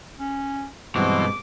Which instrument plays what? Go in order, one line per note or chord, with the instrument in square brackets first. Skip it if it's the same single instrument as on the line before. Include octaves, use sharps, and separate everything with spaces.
[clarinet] C#4
[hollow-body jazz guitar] G2 G#3 C4 [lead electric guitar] B2 [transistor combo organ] E3 F#3 C5 [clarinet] D6